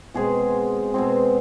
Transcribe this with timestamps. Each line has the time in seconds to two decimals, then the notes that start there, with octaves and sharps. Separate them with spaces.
0.14 B2 G#3 C4 G#4
0.94 B2 G#3 C4